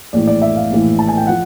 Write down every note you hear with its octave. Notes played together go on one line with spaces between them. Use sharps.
A#1 A2 E3 D5
D5
E5
F5
A#1 A2 E3
A5
G#5
G5
F3 F#5